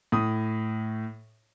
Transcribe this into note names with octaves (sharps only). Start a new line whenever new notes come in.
A2 D#6